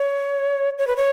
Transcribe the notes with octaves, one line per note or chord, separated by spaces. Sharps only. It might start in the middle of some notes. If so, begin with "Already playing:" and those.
Already playing: C#5
C#5
B4
C#5